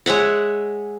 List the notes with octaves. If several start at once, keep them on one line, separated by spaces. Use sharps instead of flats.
G#3 C#5 E5 F#5